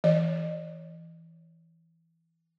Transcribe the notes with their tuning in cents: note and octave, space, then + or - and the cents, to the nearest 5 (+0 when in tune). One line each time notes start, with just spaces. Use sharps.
E3 +0 D#5 -35